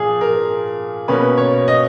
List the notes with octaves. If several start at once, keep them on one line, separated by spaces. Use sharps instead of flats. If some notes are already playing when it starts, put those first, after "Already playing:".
Already playing: A#2 F3 G#4
A#4
B2 A#3 C#4 B4
C#5
D#5